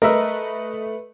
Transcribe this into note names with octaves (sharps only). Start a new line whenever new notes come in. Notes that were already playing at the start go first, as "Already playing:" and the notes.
A3 A#4 B4 D#5 E5